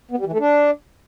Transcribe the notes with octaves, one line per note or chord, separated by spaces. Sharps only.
B3
G3
E3
A3
D4